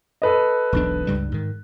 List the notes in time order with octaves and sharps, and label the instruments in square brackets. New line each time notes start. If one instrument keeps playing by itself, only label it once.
[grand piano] A4 B4 D#5
[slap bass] E1 B1 D4
C#2 G2 G3
G#2 D#3